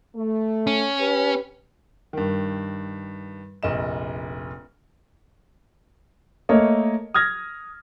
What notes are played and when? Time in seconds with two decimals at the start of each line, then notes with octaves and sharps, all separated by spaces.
0.16 A3
0.67 C#4
0.99 G4 B4
2.13 G2 D#3
3.63 F1 A#1 D#5 E7
6.49 A3 A#3 A#4 C#5 D#5
7.14 D#6 F6 G#6 A#6